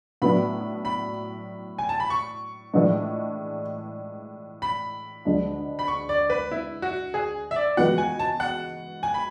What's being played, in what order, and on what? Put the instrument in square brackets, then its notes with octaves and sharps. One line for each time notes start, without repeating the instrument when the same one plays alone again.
[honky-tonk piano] A2 F#3 B3 D4 [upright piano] B5
[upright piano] B5
G#5
A5
B5
C#6
[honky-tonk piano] A2 E3 G#3 D4
[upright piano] B5
[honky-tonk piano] D2 D3 G#3 D4
[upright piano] B5
C#6
D5
B4
E4
F#4
G#4
E5
D5
[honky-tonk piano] E3 G#3 B3 F#4 [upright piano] F#5
[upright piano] G#5
A5
F#5
G#5
B5